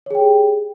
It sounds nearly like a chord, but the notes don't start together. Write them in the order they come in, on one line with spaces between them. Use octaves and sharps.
C#5 G#4 G5 G4